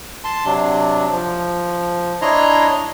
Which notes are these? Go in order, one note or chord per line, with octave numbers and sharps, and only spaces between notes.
A5 C6
C3 F#3 D4
F3
D4 E4 C#5 D#5 A#5 C6